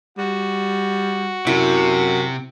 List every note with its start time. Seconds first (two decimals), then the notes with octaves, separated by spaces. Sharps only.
0.18 G3 F#4
1.47 F#2 C3 E4